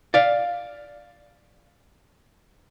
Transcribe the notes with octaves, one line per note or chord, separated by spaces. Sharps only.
D5 F5